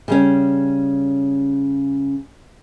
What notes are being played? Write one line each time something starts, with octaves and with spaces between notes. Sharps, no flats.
C#3 G3 C#4